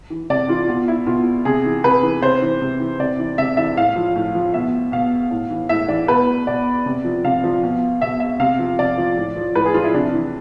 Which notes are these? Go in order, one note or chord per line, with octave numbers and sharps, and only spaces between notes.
E3
C3 D5
E3 F4
B2 F4
E4
B2 F4
C3 G#4
E3
C3 B4
E3
C3 C5
E3
C3
E3
C3 D5
E3
C3 E5
E3 E5
A2 F5
F3
A2
F3
B2 E5
B2 F5
A2
E3
A2 E5
E3 D5
B2 B4
B2 D5
C3
F3
C3 F5
F3
B2
B2 E5
E5
C3 F5
F3
C3 D5
F3
A2
F3
A2 B4
G#4
F3 F4
E4
C3 D4
E3